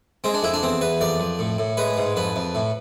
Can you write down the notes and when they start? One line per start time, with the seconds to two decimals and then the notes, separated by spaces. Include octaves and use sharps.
0.24 G#3 C4
0.34 D4
0.43 F2 E4
0.54 D4
0.63 E2 C4
0.81 E2 B4
1.01 F2 D5
1.20 F2
1.39 A2
1.58 A2
1.77 G#3 B4
1.97 G#2
2.16 F2 B4
2.36 F2
2.55 A2